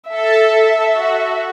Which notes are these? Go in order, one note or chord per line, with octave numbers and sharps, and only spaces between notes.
A4 E5
F#4